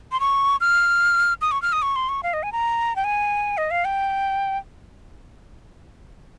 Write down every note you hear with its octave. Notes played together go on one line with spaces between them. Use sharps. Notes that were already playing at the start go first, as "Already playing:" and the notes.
C6
C#6
F6
D#6
C#6
F6
D#6
C#6
C6
C#6
F5
D#5
G#5
A#5
G5
G#5
D#5
F5
G5